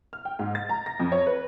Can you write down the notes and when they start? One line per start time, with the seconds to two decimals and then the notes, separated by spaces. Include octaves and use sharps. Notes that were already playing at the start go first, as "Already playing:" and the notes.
0.13 F6
0.25 G5
0.39 G#2
0.55 A6
0.69 A#5
0.86 A#6
1.00 F2
1.12 C#5
1.27 B4